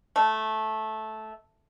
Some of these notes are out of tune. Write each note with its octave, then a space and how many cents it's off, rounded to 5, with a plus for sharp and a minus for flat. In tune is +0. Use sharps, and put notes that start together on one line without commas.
A3 -10